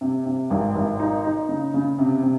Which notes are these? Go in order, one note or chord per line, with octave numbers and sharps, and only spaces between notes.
C3
C3
G#1
G#1
D#4
D#4
C#3
C#3
C3
C3